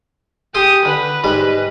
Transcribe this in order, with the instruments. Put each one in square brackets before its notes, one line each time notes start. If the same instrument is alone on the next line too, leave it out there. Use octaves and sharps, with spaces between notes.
[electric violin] G4 D#6 [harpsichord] G#4 G5 C6
[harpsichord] D3 [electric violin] B4
[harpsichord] G#2 G3 G#3